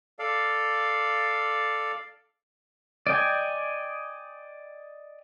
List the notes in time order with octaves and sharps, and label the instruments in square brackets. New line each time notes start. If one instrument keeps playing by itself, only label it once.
[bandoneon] A4 D5 F5
[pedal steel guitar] D5 D#5 G5 G#5